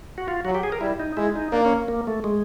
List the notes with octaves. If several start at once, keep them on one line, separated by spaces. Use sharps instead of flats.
F#4
F4
F#3 F#4
G4
G#4
A#4
G3 E4
D#4
G#3 E4
D#4
A#3 D4
C#4
A#3
A3
G#3